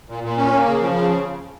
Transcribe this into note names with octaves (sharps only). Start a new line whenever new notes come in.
A#2
A#2
C#4
A#3
C#3
F3
C#3